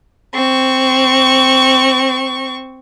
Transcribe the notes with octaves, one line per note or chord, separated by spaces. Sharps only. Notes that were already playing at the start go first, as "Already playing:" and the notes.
C4 C#6